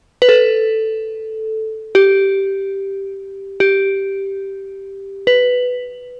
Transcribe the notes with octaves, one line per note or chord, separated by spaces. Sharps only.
B4
A4
G4
G4
B4